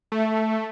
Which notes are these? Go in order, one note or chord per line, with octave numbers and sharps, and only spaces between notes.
A3